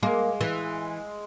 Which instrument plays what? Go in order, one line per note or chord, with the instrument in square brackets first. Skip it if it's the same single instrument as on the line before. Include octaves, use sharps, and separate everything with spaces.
[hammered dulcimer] G#3 [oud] A#3
[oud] E3